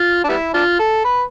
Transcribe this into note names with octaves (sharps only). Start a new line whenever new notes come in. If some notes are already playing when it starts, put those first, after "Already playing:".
Already playing: F4
D4
G3 B3 E4
D4 F4
A4
B4